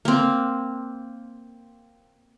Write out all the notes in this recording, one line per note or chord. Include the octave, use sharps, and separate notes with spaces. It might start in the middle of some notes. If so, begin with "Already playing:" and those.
A#3 C4